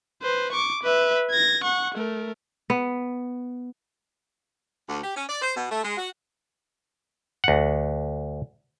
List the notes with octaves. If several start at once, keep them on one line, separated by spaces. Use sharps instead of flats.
B4 C5
C#6 D6
B4 E5
G#6 A#6
F#5 C#6
A3 A#4
B3
D2
G4
C#4
D5
C5
B2
A3
G#3
F#4
D2 F#5